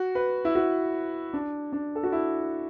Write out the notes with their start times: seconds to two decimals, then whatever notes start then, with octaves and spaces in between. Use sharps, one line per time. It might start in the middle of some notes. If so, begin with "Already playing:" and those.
Already playing: F#4
0.15 B4
0.45 E4
0.55 F#4
1.33 D4
1.73 D4
1.95 A4
2.03 F#4
2.12 E4